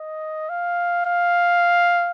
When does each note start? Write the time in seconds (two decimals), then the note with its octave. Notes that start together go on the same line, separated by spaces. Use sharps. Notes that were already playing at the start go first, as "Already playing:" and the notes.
Already playing: D#5
0.49 F5
1.06 F5